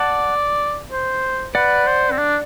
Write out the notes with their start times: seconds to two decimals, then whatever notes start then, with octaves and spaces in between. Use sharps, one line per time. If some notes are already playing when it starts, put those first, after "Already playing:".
Already playing: D5 F#5 A5
0.92 C5
1.55 B4 D5 F#5
1.87 C5
2.11 C4
2.18 D4